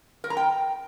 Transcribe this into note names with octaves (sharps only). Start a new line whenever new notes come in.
A#4
A#5
G5